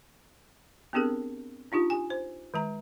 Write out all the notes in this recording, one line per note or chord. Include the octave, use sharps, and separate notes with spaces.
B3 C4 D4 G4 G#4 A#4
D4 D#4 F4 G4
G4 G#5
C5
D#3 G#3 A#5